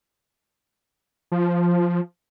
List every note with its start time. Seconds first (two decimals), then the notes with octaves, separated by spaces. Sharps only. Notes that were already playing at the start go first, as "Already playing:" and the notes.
1.32 F3